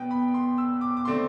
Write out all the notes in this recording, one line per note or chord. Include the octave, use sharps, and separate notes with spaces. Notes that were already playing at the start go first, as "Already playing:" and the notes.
Already playing: B2 B3 G5
B5
C6
E6
D6
D6
D3 A3 C4 C6